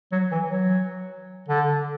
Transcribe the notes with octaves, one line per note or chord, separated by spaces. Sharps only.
F#3
E3
F#3
D3